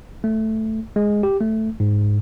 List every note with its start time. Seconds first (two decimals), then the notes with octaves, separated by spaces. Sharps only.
0.24 A3
0.96 G#3
1.23 G4
1.41 A3
1.80 G#2